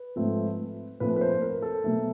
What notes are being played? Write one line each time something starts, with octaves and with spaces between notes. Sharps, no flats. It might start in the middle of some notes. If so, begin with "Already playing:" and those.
Already playing: B4
G#2 F3 A3 C4
A#2 F3 A3 C4 B4
B4
C5
A#4
A4
B2 F#3 A3